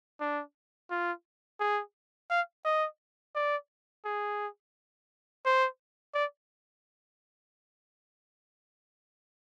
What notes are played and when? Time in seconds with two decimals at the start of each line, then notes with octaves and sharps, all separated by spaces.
0.20 D4
0.91 F4
1.60 G#4
2.30 F5
2.65 D#5
3.35 D5
4.05 G#4
5.45 C5
6.14 D5